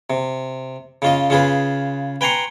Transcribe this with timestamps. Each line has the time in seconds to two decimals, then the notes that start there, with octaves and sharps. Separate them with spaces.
0.10 C3
1.02 C#3 F4 D#5
1.30 C#3 F4 G#4 B4
2.21 B4 G5 G#5 A#5 C6 C#6